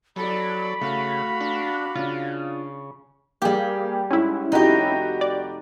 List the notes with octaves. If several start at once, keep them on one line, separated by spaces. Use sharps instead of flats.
F#3 A4 D5 B5
C#3 A3 F#4 F5
D4
C#3 D4 F4
G3 A#3 G4 G#4 F5
G#2 C#4 E4
F1 D#4 F#4 G4 D#5
D5